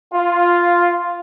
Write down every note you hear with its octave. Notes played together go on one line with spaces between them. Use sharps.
F4